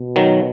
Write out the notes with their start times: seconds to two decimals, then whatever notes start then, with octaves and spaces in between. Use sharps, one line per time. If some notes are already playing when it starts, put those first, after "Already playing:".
Already playing: B2
0.16 D#3 F#3